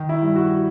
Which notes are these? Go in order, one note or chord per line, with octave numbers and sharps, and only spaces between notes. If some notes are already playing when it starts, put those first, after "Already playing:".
Already playing: D#3
E4
G2
F#4